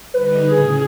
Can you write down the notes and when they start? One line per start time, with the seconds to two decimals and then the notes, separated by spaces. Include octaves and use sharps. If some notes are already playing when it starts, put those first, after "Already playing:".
0.14 D3 G3 D#4 B4
0.50 A2 C#3 G#4